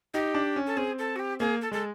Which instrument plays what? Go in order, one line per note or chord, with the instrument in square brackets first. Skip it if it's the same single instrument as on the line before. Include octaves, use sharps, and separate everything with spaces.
[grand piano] D#4 [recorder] G4
[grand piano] D4
C#4
[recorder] A4
[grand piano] C4 [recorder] G#4
[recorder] A4
F#4
G4
[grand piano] A#3 [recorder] G#4
[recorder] A4
[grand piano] G#3 [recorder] A4